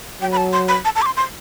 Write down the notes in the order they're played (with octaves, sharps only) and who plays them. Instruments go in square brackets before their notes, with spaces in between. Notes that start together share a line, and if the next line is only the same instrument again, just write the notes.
[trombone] F#3 [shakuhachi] G5
[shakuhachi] B5
A5
C6
B5
A5
A5
D6
C6
C6